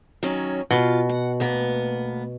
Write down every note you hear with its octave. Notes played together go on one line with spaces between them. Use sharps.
D#3 F#3 C#4
B2 F4
F#5
D2 A#3 B3